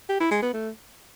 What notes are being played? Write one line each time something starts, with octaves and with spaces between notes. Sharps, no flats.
G4
E4
G#3
B3
A3